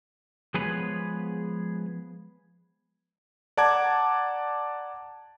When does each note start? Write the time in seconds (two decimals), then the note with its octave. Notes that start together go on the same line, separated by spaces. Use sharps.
0.54 F3 G#3 B3 G#4 B4 C#5
3.57 D5 F#5 A5 A#5 D6 G#6